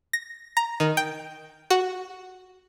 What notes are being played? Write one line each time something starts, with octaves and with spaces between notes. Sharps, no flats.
A#6
A#5
D#3
G5
F#4